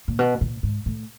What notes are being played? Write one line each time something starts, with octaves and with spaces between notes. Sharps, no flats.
A#2
B2
A#2
G#2
A2